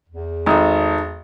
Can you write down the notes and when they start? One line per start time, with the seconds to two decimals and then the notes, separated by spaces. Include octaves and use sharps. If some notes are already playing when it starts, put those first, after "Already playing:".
0.09 E2
0.46 G#1 D#4 A4